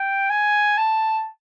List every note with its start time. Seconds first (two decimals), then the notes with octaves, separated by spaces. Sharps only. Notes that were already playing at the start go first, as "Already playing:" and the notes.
Already playing: G5
0.30 G#5
0.77 A5